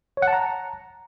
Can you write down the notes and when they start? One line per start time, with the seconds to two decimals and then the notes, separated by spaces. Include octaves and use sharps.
0.17 C#5
0.22 F#5
0.28 A5
0.33 A#5